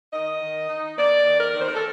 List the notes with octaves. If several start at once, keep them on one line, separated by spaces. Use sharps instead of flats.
D#3 D#5
D#3
D#4
A#3 D5
D#3
A#4
D#3
C5
A#4
A4